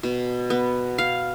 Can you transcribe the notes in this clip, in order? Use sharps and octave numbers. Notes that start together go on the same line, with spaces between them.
B2
B3
F5